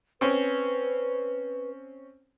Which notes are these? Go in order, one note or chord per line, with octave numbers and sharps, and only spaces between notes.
C4 C#4 B4